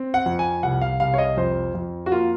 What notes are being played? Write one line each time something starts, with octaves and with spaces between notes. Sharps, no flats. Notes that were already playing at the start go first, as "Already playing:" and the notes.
Already playing: C4
F#5
F2
G#5
C2 F#5
F5
C2 F5
C#5
D#5
F2 C5
F2
F#4
A#3 F4